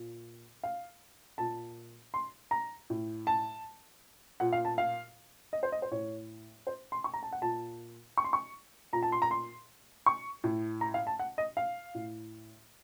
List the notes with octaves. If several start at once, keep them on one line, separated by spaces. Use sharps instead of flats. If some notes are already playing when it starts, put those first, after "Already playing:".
Already playing: A#2
F5
A#2 A5
C6
A#5
A2
A5
A#2 F#5
F5
A5
F5
D#5
C5
D#5
C5
A2 C#5
C5
C6
C#6
A#5
A5
F#5
A#2 A5
C#6
C6
C#6
A#2 A#5
A5
C6
A#5
C6
C#6
A2
A#5
F5
A5
F#5
D#5
F5
A2